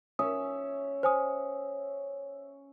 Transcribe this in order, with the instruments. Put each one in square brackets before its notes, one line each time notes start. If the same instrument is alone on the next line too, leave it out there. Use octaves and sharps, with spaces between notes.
[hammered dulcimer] C#4 C#5 E5 [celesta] D#6
[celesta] C5 G#5 D#6